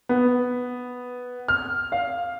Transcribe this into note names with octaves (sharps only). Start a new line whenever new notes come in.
B3
F6
F5